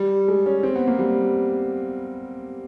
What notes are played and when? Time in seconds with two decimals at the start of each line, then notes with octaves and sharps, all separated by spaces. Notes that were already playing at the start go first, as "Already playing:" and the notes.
Already playing: G3
0.28 G#3
0.46 C#4
0.63 C4
0.76 B3
0.88 A#3
0.99 G3